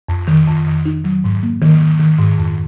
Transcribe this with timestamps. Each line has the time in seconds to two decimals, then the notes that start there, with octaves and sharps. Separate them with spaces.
0.09 F2
0.28 D#3
0.48 F2
0.67 D#3
0.85 D#4
1.04 F#3
1.24 G#2
1.43 A#3
1.62 D#3
1.81 D#3
2.00 D#3
2.19 G#2
2.38 F2